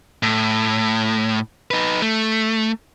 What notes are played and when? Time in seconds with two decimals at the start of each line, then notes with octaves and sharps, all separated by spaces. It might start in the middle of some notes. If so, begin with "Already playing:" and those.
0.23 A2
1.71 D#4 B4
2.02 A3